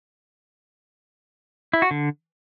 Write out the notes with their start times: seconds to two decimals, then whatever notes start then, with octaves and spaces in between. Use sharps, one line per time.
1.73 E4
1.82 F#4
1.91 D3